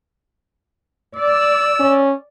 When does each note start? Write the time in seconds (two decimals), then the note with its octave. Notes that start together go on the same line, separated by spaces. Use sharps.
1.17 D5 E6
1.80 C#4